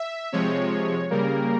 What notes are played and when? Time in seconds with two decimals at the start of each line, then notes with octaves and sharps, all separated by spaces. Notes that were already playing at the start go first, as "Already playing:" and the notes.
Already playing: E5
0.32 C3 F3 G#3 C#5
1.10 C#3 G3 A#3 A#4